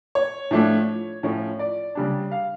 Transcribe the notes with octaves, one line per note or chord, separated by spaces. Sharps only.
C#5
A2 F3 A3 D4
A2 F3 C#4
D5
C#3 G3 D4
F5